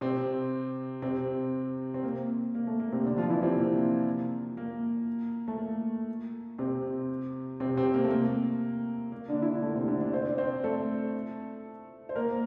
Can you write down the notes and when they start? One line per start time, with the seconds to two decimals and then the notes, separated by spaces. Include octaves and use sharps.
0.01 C3 C4
1.02 C3 C4
1.94 C4
2.03 A#3
2.55 A#3
2.67 A3
2.80 A#3
2.93 C3 C4
3.05 D3 D4
3.18 F3 F4
3.30 E3 E4
3.42 C3 C4
3.56 A#3
4.57 A#3
5.48 A3
5.58 A#3
6.58 C3 C4
7.60 C3 C4
7.77 C3 C4
7.94 A#3
8.04 A3
8.11 A#3
9.12 A#3
9.28 D3 D4
9.42 E4
9.46 D3 D4
9.62 A3
9.75 C3 C4
9.88 D3 D4
10.01 D3 D4
10.13 C4 C5
10.26 D4 D5
10.38 C4 C5
10.64 A3 A4
12.09 C5
12.16 A#3 A#4